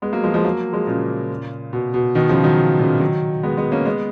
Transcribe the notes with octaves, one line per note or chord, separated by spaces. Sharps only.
G#3 B3
F#3 A#3
F3 G#3
F3 G#3
F#3 A#3
F3 G#3
A#2 C#3
B2
B2
B2 D#3
C#3 F3
D#3 F#3
A#2 C#3
D#3 F#3
G#3 B3
G#3 B3
A#3 C#4
G#3 B3